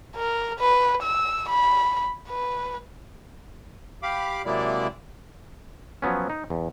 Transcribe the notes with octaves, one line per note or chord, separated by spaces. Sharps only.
A#4
B4
E6
B5
B4
G4 F5 B5 D6
C3 F#3 G#3 A#3 E4 D5
F3 F#3 B3 C#4
D#4
E2